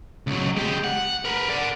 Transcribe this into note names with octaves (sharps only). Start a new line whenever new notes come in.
C#2 F#3
G#3 G4
F#5
A#4 B4
D5 F#5